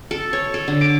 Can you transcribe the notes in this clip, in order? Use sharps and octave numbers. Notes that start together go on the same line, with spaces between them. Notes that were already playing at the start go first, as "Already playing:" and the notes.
A4
C#5
A4
D3
D6